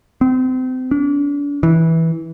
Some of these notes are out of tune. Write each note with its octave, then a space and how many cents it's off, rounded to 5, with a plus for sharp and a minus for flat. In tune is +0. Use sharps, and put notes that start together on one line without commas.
C4 -30
D4 -40
E3 -15